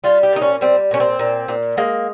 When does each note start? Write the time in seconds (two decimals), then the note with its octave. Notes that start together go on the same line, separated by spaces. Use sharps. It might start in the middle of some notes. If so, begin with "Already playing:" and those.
0.04 G3 F4
0.23 G4
0.33 A#2 D#4
0.42 C#4
0.61 G3 C4
0.91 A#2 C#4
1.00 C4
1.19 A#2
1.48 A#2
1.77 G#3 A#3